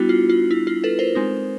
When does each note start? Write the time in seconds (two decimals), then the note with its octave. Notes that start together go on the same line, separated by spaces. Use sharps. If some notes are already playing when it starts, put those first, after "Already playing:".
Already playing: G3 B3 D4 E4 F#4
0.09 F4
0.29 F4
0.51 E4
0.67 F4
0.84 A4 B4
0.99 A#4 C5
1.15 G#3 C4 D#4